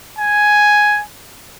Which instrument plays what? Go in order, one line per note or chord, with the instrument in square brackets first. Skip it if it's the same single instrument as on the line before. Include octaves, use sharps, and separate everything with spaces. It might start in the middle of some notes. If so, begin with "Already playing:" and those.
[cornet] G#5